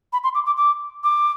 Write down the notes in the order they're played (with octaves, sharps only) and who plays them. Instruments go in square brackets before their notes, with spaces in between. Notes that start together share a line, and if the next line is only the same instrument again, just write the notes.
[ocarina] B5
C6
D6
D6
D6
D6